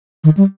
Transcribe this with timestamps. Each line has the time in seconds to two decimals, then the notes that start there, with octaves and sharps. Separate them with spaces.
0.24 D#3
0.37 G3